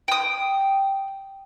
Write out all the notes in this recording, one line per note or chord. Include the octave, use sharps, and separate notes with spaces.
G5 D#6